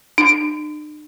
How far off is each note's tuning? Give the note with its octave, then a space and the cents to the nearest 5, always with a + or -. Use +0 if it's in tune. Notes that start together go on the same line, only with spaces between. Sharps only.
D4 +45